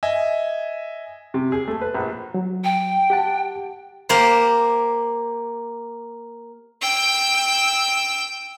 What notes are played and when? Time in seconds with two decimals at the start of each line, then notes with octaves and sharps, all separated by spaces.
0.03 D#5 E5 G#5
1.34 C3
1.52 G#4
1.68 A3
1.81 B4
1.95 A#1
2.34 F#3
2.64 G5
3.10 G4 F#5 A5
4.09 A#3 G4 C5
6.81 G5 E6